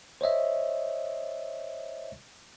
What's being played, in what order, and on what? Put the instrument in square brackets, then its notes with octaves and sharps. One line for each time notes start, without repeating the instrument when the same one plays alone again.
[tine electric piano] C5 C#5 D#5 E5